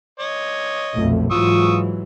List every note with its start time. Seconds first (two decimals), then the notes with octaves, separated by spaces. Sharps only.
0.19 C#5 D#5
0.95 B1 F2 A#2 A3
1.31 G#2 E3 F#3 F4 C#6 D#6 E6